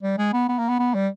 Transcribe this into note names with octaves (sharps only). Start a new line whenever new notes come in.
G3
G#3
B3
B3
A#3
B3
B3
G3